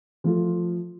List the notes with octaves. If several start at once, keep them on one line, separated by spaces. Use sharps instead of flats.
F3 A3 F4